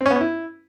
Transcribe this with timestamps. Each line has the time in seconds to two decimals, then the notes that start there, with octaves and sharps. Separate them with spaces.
0.01 C4
0.06 C#4
0.11 B3
0.16 C#4
0.21 E4